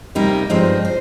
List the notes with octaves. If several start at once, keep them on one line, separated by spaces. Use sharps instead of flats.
C3 G3 A#3 D#4 A#4
G2 F3 G#3 C4 D#4
C5